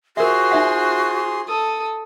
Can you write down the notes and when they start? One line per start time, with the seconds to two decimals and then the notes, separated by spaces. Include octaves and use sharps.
0.17 F4 F#4 G#4 A#4 C5 E5 C6
0.51 D#4 E5 F#5
1.47 A4 D#6